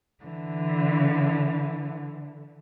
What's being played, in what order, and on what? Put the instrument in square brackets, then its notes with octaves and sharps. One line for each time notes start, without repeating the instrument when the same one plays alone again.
[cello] D3 E3